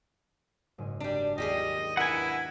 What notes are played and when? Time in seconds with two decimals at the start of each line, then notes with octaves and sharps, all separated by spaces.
0.78 F#1 G#2 G#5
1.00 G3 D4
1.38 D#2 G3 F4 G4 G#4 D#5
1.97 D4 E4 A#4 B4 F#5 G#5